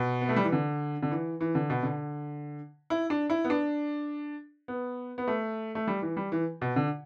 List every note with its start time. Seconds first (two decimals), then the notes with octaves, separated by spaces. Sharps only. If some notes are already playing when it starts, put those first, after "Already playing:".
Already playing: B2
0.21 B3
0.29 A3
0.36 G3
0.44 E3
0.52 D3
1.03 D3
1.11 E3
1.41 E3
1.55 D3
1.70 B2
1.83 D3
2.90 E4
3.10 D4
3.30 E4
3.44 B3
3.50 D4
4.68 B3
5.18 B3
5.28 A3
5.75 A3
5.87 G3
6.02 E3
6.17 G3
6.32 E3
6.61 B2
6.76 D3